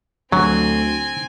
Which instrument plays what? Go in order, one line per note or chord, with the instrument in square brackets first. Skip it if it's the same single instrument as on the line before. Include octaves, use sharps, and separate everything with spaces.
[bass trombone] D2 [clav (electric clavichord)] F#3 [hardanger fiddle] C4 G#5